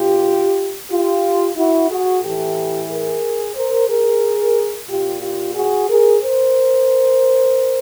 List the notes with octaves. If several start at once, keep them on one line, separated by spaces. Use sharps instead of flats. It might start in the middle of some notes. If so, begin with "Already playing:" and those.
Already playing: B2 F4 G4
F4 G4
E4 F#4
F#4 G#4
A2 E3 G4 A4
G#4 A#4
A#4 C5
G#4 A#4
A#2 F4 G4
F4 G4
F#4 G#4
G#4 A#4
A#4 C5